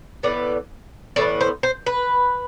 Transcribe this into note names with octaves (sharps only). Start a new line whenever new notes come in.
A2 E3 B3 D5
A2 E3 B3 D5
C5
C5
B4